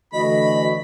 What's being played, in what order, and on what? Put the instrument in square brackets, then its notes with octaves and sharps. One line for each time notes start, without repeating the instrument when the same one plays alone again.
[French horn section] D3 E3 A3 [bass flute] F#4 [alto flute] D#5 [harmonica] B5